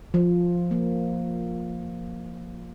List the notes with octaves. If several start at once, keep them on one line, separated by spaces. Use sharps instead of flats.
F3
A#3